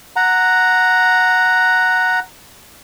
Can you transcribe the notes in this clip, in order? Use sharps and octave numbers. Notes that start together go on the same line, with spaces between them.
F#5 A#5